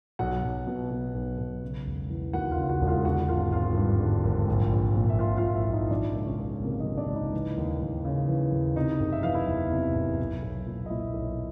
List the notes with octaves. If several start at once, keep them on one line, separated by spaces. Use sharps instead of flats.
B1 F#4 F#5
B1
B2
B2
B1
B1
C#3
E1
E3
D#2 F#4 F#5
F4 F5
C#3
F#4 F#5
E1
F4 F5
D3 F#4 F#5
G#1 F4 F5
G#1 F4 F5
G2
D3
G#1
A#1
A#1
A#2
E5
A#2 F4 F5
F4 F5
A#1
E4 E5
A#1
D#4 D#5
D#3 D4 D5
C#2
C#4 C#5
C#2
C3 A#3 A#4
D#4 D#5
D#3
D4 D5
C#2
D#4 D#5
E3
D#2
D#2
C#3
E3
D#2
C3 D#4 D#5
F#1
E5
E3 F5
E4 E5
E2
C3
F#1
B1
B1
A#2
D#5
A#2 E4 E5
B1